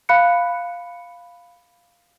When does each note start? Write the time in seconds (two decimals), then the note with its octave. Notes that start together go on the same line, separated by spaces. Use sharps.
0.09 F5 B5 F#6 C#7